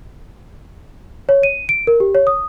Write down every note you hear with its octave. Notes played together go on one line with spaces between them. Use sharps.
C#5
D#7
D7
A#4
G4
C#5
D#6